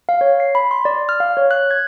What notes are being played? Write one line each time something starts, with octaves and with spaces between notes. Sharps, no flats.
F5
C#5
C7
B5
C6
D5
F6
F5
C#5
F#6
G#6